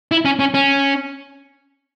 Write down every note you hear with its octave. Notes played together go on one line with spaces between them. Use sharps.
E4
C#4
C#4
C#4